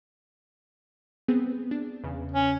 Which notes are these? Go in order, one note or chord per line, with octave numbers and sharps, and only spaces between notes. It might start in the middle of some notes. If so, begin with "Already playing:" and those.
B3 C4 G#4
D4
E2 C#3
C#4